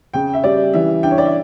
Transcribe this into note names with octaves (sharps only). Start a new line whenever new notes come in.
C#3 G5
E5
G3 D5
E3 E5
D4 G5
C#5
D5
E5